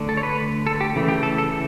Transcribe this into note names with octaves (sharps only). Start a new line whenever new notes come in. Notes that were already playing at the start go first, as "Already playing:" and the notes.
Already playing: D3 A3 D4
A4
C#5
B4
A4
G4
C#3 E3 A3
G4
A4
A4